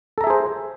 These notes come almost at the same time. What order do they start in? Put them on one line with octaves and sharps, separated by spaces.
A4 A#5 E5 G#4 C5